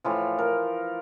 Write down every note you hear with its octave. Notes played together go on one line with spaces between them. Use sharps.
A2 E3 F3
A#4